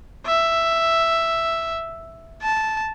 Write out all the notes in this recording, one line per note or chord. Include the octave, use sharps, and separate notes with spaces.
E5
A5